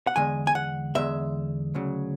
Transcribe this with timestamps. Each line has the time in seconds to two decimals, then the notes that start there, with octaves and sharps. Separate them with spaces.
0.07 F#5
0.16 E2 D3 G#3 G#5
0.47 G#5
0.55 F#5
0.95 E2 D3 G#3 E5
1.75 D2 C#3 F#3